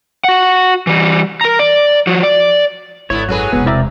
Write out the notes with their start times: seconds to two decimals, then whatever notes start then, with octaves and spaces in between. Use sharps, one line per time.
0.24 F#4 F#5
0.87 E3 G3
1.41 A#4 A#5
1.59 D5
2.07 F3 F#4
2.23 D5
3.10 G#1 D3 B3 E4 C#5
3.29 F#2 F#3 C#4 F#4 G#4 A4 B4
3.53 E1 C3 B3
3.66 C4 E4 A#4 D5 E5 A#5